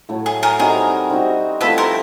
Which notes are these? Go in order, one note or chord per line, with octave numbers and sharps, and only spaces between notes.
A2 F#3 A3
G#4
G#4 A#4
G3 C4 D#4 F#4 G#4 A#4
G3 C4 D#4 F#4
F3 A3 C4 E4 A4 B4
A#4 C5